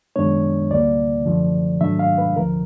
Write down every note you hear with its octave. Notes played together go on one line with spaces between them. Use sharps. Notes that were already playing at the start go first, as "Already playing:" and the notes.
F#2 D#3 G#3 B3 D4 C#5
D2 D3 G3 A#3 D5
F#2 D3 F3 A3
G#2 D#3 F#3 A3 D4 E5
F5
B4
D2 D3 F3 A#4